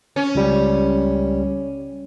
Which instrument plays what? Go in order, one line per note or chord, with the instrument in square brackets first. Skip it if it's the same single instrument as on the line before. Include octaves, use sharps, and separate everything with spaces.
[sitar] C#4
[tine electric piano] C#2 G3